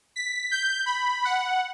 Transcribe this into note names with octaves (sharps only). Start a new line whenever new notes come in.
B6
G6
B5
F#5